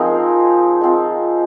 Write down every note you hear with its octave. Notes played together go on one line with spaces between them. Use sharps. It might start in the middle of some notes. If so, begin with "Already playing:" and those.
Already playing: F3 G#3 C4 D#4 G#4 A#4 C5
G#3 C4 F4